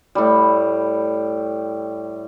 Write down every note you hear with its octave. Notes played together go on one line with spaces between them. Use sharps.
A2 G3